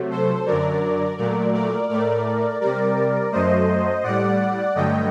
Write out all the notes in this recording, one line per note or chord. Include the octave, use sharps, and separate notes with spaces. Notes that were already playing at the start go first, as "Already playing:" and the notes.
Already playing: C3 F#3 A3
A4 C5
F#2 D3 F#3 A#4 D5
A#2 F#3 A3 A#4 D5
A#4 D5
A2 A3 A#4 D5
C3 G3 A#4 D5
F#2 F#3 A3 C5 D#5
A2 G3 D5 F#5
G2 D3 F#3 A3 D#5 G5